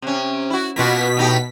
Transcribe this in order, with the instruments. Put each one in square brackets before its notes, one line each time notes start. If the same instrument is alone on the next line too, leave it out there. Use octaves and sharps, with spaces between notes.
[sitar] C3 C#4
E4 F#4
[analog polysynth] B2 B6 [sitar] A#3 F4 F#4
[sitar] A2 D#4 G4